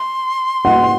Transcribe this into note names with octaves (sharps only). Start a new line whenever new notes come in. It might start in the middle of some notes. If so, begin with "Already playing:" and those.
Already playing: C6
F#5